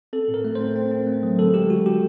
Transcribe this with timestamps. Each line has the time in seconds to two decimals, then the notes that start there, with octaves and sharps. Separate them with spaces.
0.13 C4 A4
0.28 A2
0.34 A#4
0.45 A3
0.55 C5
0.61 C4
0.76 C4
0.91 C4
1.07 A3
1.23 F#3
1.39 D3 A4
1.54 G#3 G4
1.70 D3 F#4
1.86 D3 G4